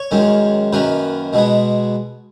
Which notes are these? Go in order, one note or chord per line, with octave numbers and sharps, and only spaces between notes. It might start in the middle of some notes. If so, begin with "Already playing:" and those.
Already playing: C#5
F#2 D#3 G#3 C#4
F#2 D#3 A#3 C#4 B4
B2 G#3 B3